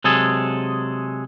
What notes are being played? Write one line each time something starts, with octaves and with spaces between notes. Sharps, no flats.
C3 F#3 G#3 G#4 A4